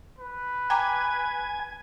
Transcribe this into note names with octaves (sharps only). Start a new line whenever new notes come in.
B4
G5 G#5 A#5 D6